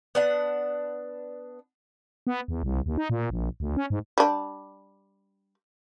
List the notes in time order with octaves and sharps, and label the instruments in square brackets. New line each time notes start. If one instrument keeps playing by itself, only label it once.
[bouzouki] B3 D4 F#5
[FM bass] B3
E2
C2
D#2
D#4
A#2
A#1
D2
C#4
G#2
[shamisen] G3 D4